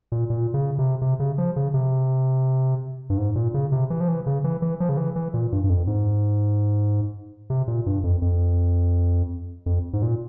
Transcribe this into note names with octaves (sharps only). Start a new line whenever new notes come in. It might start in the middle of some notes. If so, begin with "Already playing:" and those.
A#2
A#2
C#3
C3
C3
C#3
F3
C#3
C3
G2
G#2
A#2
C#3
C3
E3
F3
E3
C#3
E3
E3
F3
C#3
E3
E3
A#2
G2
G2
F2
G#2
C3
A#2
G2
F2
F2
F2
G#2
A#2